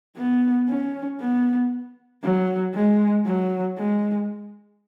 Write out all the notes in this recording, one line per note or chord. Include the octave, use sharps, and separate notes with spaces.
B3
C#4
B3
F#3
G#3
F#3
G#3